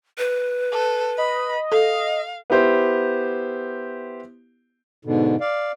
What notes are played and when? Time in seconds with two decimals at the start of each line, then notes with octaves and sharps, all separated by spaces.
0.18 B4
0.72 A4
1.18 D#5 B5
1.72 A4 F5
2.50 B3 E4 G4 C5
5.05 G#2 B2 D3
5.41 D5 F5